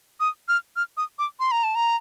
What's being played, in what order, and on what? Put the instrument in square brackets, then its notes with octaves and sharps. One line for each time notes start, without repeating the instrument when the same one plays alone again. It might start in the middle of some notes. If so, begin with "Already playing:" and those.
[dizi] D#6
F6
F6
D#6
D6
C6
A#5
A5
A#5